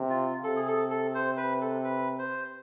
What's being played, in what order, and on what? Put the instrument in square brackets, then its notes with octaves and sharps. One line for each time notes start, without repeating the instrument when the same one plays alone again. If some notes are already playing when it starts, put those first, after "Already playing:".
Already playing: [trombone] C3
[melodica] F4
[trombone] C3 [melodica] A4
[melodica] G#4
A4
A4
C5
B4
A4
B4
C5